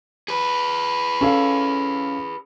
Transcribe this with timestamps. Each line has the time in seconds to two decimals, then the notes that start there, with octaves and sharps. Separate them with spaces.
0.28 G#4 B4
1.21 C#4 A4 F5